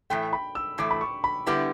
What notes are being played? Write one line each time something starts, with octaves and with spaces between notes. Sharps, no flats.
A2 E3 A3 G5
B5
E6
A2 E3 A3 D6
B5
C#6
B5
D3 G3 B3 E4 G4 D6